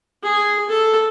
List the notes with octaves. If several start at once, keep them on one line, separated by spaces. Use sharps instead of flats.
G#4
A4